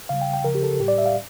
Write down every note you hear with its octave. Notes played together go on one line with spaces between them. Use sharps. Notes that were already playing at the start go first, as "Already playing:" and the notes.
C#3 G3 F5
G5
G5
C#3 F3 A#4
G4
A4
A2 G3 G4 D5
E5
F5